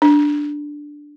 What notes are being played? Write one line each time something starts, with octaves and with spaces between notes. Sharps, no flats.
D4